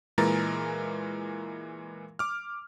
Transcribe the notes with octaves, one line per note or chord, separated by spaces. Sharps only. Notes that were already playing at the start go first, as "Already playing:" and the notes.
A#2 E3 G#3 A#4 A#5 A6
D6 F6